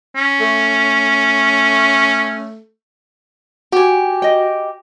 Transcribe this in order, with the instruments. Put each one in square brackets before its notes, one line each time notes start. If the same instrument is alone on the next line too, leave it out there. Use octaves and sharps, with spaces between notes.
[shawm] C#4
[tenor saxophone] A3
[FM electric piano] F#4 [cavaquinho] G4 G#5
[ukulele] D#5 G5